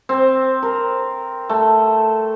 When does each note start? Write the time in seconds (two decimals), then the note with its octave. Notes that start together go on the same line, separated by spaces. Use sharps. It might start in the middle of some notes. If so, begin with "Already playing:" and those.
0.09 C4
0.63 A#4
1.49 A3